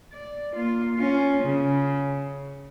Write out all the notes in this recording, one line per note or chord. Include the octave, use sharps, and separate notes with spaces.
D5
A#3 F4
C#4 F4
C#3